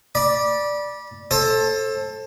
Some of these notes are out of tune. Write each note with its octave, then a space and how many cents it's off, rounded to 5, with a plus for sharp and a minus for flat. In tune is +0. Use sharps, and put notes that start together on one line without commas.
D5 +0 B5 -30
A4 +0 C5 +35